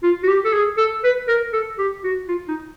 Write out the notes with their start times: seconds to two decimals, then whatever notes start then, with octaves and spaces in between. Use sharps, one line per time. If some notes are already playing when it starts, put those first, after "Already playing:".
0.03 F4
0.23 F#4
0.28 G4
0.45 A4
0.53 G#4
0.78 A4
1.04 B4
1.28 A#4
1.53 A4
1.79 G4
2.04 F#4
2.29 F4
2.48 D#4